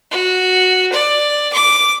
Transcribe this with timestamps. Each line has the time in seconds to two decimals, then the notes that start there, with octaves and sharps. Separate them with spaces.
0.11 F#4
0.93 D5
1.53 D6